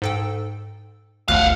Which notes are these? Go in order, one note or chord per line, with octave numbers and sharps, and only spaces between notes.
G#2 A4 G5
G1 D2 F5 F#5 F#6